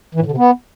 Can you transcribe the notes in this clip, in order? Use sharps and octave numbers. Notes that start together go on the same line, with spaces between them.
E3
A2
D3
C3
B3